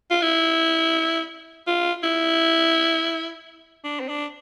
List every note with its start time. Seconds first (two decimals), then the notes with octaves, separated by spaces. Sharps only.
0.11 F4
0.22 E4
1.67 F4
2.03 E4
3.84 D4
4.00 C4
4.09 D4